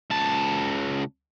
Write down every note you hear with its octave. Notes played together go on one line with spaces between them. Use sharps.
C#2 A5